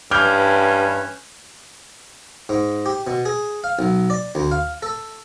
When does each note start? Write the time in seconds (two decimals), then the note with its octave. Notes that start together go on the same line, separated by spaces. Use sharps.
0.11 G2 E3 C#4 D6 F6 G6
2.49 G#2
2.86 G4
3.07 B2
3.25 G#4
3.64 F5
3.79 B1
4.10 D5
4.35 D2
4.51 F5
4.82 A4